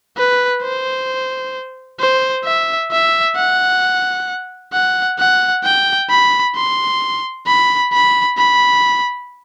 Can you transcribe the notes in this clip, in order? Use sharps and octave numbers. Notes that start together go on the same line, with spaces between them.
B4
C5
C5
E5
E5
F#5
F#5
F#5
G5
B5
C6
B5
B5
B5